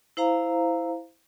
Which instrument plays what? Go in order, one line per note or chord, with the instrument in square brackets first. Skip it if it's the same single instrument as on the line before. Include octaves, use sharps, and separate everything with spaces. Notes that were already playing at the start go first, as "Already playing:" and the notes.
[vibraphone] E4 C5 F5 A#5